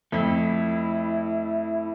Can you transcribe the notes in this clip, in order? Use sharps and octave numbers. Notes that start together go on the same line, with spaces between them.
F2 A3 E4